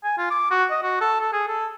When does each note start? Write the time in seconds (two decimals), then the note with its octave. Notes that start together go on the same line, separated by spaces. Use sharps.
0.04 G#5
0.18 F4
0.30 D6
0.51 F#4
0.71 D#5
0.83 F#4
1.01 A4
1.21 A4
1.33 G#4
1.48 A4